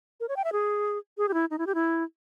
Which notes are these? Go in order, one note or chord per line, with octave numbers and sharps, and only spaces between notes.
A#4
C#5
G5
E5
G#4
G#4
G4
E4
D#4
E4
G4
E4